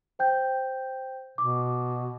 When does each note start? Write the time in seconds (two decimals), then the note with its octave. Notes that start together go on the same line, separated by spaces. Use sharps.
0.19 C5 G5 G6
1.38 B2 D6